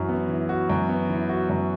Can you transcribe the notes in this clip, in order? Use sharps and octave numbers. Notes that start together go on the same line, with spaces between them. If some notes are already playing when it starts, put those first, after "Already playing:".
Already playing: F#2 E3 F#4
B3
E3
F#4
F#2
B3
E3
F#4
F#2